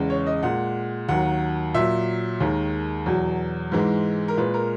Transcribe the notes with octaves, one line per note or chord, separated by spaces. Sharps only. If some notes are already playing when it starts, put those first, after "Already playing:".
Already playing: E2 C#3 G#3
C#5
D#5
A#2 G#3 F#5
D#2 D#3 F#3 F#5
A#2 F#3 E5
D#2 D#3 G#3
E2 B2 F#3
G#2 E3 G#3
A#4
A#2 G#3 B4
A#4